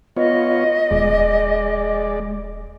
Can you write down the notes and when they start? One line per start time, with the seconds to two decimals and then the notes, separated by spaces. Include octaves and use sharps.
0.17 B3 F4 C#5 D#5
0.91 D#1 G#3 D5